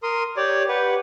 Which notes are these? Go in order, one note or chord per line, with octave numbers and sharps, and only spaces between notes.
A#4 C6 D#6
G4 C#5 D5
G4 B4 F#5